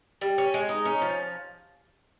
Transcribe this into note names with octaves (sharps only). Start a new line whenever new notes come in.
G3
C#4
G#3
D#4
C#4
F3